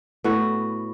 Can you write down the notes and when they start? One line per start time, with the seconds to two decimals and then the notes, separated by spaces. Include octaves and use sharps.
0.24 A2 B3 F#4